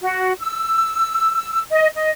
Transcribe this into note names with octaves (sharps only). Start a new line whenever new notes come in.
F#4
E6
D#5
D#5